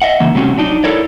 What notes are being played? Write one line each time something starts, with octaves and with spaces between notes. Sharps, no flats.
D#5 E5 F#5
C#3 E3 A#3
C3 G3 A3 C4 C#4 F#4
F#3 D4 D#4
E4 A4 A#4 C#5 D5